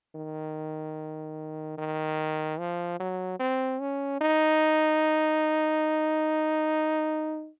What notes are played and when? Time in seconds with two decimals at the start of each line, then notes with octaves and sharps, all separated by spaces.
0.15 D#3
1.78 D#3
2.59 F3
3.00 F#3
3.40 C4
3.81 C#4
4.21 D#4